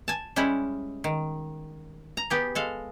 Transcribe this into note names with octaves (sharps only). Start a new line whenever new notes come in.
G#5 A5
G3 G#3 C#4 E4
D#3
A#5
B3 G4 G#4
G#3 A4 F5